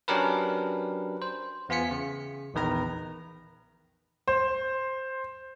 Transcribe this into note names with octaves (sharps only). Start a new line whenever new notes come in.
F#3 C#4 D4 G4 A#4 B4
C5
E2 B3 F4 G#5 B6 C#7
C#3
A#1 E2 D#3 B4 A#5
C5